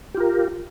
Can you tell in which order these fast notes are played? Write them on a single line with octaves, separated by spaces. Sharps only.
G4 F4 A#4